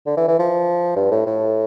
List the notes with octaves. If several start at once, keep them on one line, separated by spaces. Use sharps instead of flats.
D3
E3
E3
F3
G2
A2
A2